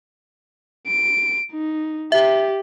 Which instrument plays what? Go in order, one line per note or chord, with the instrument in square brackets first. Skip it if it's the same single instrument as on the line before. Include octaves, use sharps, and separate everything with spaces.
[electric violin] D7
D#4
[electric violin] G4 [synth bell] E5